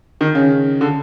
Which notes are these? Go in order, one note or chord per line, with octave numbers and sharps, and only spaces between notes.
D#3
C#3
D3